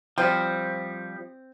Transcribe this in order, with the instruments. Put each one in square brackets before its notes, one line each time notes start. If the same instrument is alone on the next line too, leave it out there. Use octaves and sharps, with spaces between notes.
[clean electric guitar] F3 G3 [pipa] C4